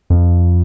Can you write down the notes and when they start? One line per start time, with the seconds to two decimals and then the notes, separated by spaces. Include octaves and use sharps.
0.10 F2